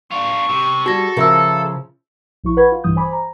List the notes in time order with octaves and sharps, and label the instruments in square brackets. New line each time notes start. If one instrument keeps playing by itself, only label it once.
[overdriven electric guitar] D4 F4 [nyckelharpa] C#6
[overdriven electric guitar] C3
[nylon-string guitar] G3 G#4 [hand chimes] F#4 A#6 [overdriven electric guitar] A4
[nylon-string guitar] C#3 F3 A#4 [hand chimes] G#4 E5 E6
[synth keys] A#1 F3 E4 C#6
B4 F#5 B5 C#6 G#6
F4
A#1 G2 E3 D#6 G6
C5 G#5 B5 D6
A#5